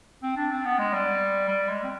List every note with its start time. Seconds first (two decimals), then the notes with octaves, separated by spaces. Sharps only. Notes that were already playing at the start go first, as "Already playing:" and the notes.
0.23 C4
0.37 D4
0.51 C4
0.65 B3
0.79 G#3
0.93 G3
1.48 G3
1.69 G#3
1.83 C4